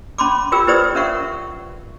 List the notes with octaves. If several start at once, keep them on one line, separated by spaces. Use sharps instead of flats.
C#4 B5 C6 D6
F4 G4 A#4 G5 E6
E4 G4 B4 C5 D5 D#6
C#4 A#4 E5 F#5 C#6